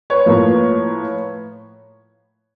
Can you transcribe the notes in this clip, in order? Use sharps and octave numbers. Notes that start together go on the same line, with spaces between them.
B4 C#5
A2 F3 A#3